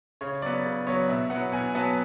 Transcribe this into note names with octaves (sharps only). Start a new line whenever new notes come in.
C#3 C#5
F#3 B3 D5
C#3
F#3 B3 C#5
B2 E5
F#3 B3 F#5
B2 G#5
F#3 B3 A5